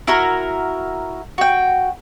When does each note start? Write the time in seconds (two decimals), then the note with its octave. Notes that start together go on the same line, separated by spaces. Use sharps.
0.07 E4 F#4 A#4 A#5
1.38 F#4 G5